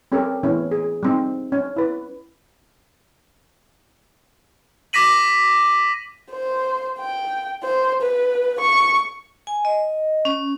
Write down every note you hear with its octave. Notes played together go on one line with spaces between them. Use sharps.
C4 C#4 G4 A4 A#4
E3 A3 B3 C#4 E4
G#4
G3 C4 D#4
C#4
E4 B4
D6 A#6 B6 D#7 F#7
C5
G5
C5
B4
C#6
G#5
D#5
C#4